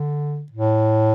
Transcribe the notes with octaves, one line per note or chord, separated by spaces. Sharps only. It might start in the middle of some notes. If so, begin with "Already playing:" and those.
Already playing: D3
A2